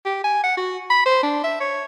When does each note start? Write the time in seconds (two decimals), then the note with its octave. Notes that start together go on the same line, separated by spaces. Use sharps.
0.05 G4
0.24 G#5
0.44 F#5
0.57 F#4
0.90 B5
1.06 C5
1.23 D4
1.44 E5
1.60 C#5